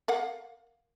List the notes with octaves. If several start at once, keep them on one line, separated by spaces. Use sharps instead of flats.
A#4 F5 F#5